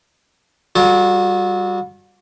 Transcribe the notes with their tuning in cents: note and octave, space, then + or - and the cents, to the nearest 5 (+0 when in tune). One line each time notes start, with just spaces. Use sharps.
G3 -10 F#4 -40 A4 -35